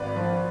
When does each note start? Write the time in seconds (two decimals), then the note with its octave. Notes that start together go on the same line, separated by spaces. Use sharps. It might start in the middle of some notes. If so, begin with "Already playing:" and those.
Already playing: G#1 B4 D5
0.16 F3